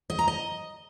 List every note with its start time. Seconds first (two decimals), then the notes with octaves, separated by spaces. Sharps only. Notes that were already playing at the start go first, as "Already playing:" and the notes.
0.10 D#5
0.19 A#5
0.27 D#5